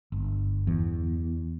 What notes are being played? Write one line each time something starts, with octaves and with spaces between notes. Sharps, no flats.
G1
E2